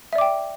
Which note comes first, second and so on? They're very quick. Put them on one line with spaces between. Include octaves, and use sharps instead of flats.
E5 D5 D6 G5